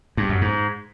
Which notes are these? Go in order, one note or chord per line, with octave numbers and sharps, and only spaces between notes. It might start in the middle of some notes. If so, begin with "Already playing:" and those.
G2
F#2
G#2